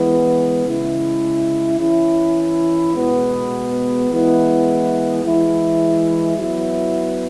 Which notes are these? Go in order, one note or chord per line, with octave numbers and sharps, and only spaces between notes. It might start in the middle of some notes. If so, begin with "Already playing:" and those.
Already playing: E3 G#3 B3
C#3 G#3 E4
E3 C#4 E4
B2 G#3 B3
E3 G#3 B3 E4
E3 G#3 E4
F#3 B3 E4